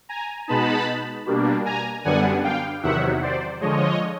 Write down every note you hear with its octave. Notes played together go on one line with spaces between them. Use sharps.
G#5 A#5
B2 G#3 B3 D#4 A5 B5
B2 G3 A#3 D4
G#5 A#5
F#2 D3 G3 B3 D4 F#5 G#5
F5 G5
E2 C3 D#3 F#3 E5 F#5
C5 D5
D3 F3 G#3 C#5 D#5